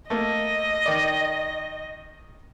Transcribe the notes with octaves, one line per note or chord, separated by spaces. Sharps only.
A3 A#3 D#5
D#3 D5